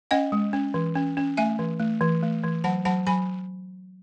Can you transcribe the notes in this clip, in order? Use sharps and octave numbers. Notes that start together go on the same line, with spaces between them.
C#4 D#5 F#5
G#3
C#4
E3
C#4
C#4
A3 E5 G#5
E3
A3
E3
A3
E3
F#3 F#5 A5
F#3 F#5 A5
F#3 G#5 B5